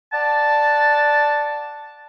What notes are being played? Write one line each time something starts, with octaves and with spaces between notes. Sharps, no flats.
D5 F#5 A5